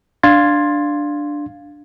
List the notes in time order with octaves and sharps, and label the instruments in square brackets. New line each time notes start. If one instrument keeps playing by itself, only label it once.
[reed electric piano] D4 F5 C6 G#6 A6